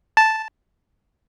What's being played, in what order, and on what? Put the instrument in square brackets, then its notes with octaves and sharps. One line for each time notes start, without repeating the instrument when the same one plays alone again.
[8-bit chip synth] A5